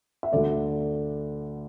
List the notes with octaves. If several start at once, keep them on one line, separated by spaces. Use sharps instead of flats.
E5
D2 D3 A3 D5